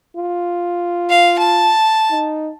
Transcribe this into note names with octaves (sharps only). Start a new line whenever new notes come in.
F4
F5
A5
D#4